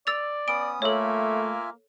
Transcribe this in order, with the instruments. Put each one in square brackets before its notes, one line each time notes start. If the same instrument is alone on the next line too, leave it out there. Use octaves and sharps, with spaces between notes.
[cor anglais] D5 [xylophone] E6 A6 F7
[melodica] B3 C#4 D#6 [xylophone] D7
[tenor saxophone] A3 [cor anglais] A#3 [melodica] F4 E5 G#5 [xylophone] A4 C#5